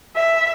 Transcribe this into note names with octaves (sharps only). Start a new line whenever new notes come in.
E5